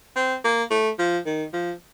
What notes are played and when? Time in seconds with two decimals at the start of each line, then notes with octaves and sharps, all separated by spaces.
0.16 C4
0.44 A#3
0.71 A3
0.99 F3
1.26 D#3
1.53 F3